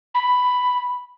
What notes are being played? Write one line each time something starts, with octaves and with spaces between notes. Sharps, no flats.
B5